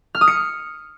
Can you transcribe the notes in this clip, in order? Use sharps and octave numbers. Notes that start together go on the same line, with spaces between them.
F6
D#6
C#7